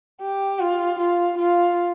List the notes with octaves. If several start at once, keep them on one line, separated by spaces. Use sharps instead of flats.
G4
F4
F4
F4